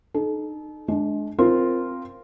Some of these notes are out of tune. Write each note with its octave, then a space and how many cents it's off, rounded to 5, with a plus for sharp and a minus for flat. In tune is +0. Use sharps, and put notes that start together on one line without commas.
D#4 -25 A4 -40
G#3 +30 D4 +0
C4 +0 F4 -5 A#4 +0